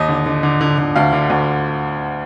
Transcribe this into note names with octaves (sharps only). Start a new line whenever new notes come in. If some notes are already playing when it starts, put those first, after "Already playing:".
Already playing: D#2 D#5
D3
D3
D3
D3
D3
D2 F5
D3
D2